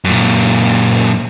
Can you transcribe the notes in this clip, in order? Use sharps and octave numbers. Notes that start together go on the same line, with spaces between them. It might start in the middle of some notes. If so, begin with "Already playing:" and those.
F#2 A#2